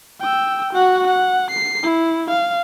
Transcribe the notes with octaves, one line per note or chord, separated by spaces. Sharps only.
G5 E6
F#4 F#5
F#5
C7
E4
F5